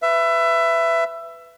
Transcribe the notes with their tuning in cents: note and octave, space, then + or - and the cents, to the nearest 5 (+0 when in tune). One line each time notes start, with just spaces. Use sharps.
B4 +10 E5 +20